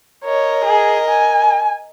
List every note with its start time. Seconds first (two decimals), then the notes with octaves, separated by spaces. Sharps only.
0.25 A#4 C#5 D#5
0.65 G#4
1.09 G#5